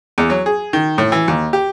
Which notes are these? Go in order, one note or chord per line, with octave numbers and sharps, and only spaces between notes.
E2
F#3
G#4
D#3
A2
E3
D#2
G4